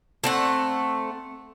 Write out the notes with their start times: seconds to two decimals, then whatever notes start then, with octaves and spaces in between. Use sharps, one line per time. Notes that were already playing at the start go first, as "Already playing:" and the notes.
0.24 A3 C4 F#5